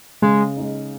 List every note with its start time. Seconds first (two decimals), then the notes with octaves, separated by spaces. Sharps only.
0.22 C#3 G#3
0.57 G#3 D#4